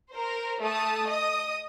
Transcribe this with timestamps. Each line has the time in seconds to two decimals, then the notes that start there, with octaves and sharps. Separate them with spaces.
0.11 A#4 C5
0.62 A3 A5 D#6
1.08 D#5 D#6